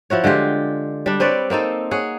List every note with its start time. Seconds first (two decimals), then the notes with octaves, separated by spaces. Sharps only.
0.10 F3 E4 F#4 C#5
0.24 D3 G#3 F4 G4
1.06 G3 D4
1.20 C4 B4 C#5 D5
1.50 A#3 C4 D#4 A4
1.91 G#4 C#5 F#5